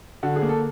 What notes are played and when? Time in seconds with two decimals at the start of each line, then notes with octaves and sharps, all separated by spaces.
0.23 D3 F#4
0.36 G#4
0.42 A#3
0.49 A4